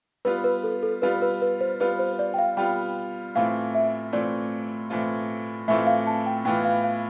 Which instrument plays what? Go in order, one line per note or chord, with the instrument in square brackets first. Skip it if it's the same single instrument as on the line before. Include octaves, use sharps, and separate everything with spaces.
[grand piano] G3 B3 F4 [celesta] B4
[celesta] B4
A4
A4
[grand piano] G3 B3 F4 [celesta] B4
[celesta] B4
B4
C5
[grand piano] G3 B3 F4 [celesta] B4
[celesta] C5
D5
G5
F5
[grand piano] G3 B3 F4 [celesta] G5
[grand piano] A2 E3 A3 C4 F4 [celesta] F5
[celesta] E5
[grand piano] A2 E3 A3 C4 F4 [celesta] D5
[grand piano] A2 E3 A3 C4 F4
[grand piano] A2 E3 A3 C4 F4 [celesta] E5
[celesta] F5
A5
G5
[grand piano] A2 E3 B3 F4 [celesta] G5
[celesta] F5
F5